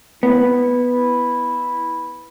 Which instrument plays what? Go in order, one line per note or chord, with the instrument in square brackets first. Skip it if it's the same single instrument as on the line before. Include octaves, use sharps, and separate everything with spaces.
[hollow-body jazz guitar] B3 [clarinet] E4